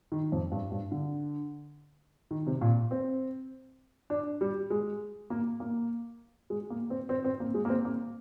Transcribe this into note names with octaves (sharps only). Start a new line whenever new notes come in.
D#3
F2
G2
G2
D3
D#3
C3
A#2
C4
D4
G3
G#3
A#3
A#3
G#3
A#3
C4
C4
C4
A#3
G#3
A#3
C4
A#3